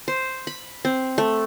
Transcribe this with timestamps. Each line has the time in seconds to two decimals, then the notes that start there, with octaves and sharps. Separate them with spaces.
0.08 C5
0.47 B5
0.85 C4
1.18 A3